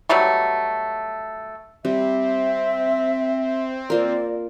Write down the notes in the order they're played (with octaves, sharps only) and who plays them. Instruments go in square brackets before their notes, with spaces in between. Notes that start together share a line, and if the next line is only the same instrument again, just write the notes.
[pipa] B2 F#3 G3 A3
[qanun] G3 [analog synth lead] C4 [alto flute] E5
[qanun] A#3 F4 A#4 [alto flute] D5